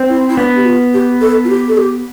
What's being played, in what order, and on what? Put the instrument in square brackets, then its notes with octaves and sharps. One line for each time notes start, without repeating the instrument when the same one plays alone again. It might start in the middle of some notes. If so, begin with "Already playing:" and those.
Already playing: [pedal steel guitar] C4
[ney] E4
E4
[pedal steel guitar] B3 [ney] D4
[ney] G4
F4
G4
A4
F4
G4
A4
G4